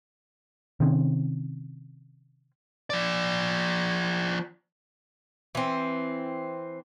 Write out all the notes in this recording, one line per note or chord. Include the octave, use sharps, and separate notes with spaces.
C3 D#3 C4 C#4
F3 D5
E3 C4